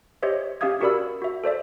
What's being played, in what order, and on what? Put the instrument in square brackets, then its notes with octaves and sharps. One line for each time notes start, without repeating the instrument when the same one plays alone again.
[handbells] G4 C5 C#5 D#5 E5
C#4 G4 E5 F5 D#6 G#6
F#4 G4 A#4 D5 B5 E6
F#4 E5
A4 C5 D5 E5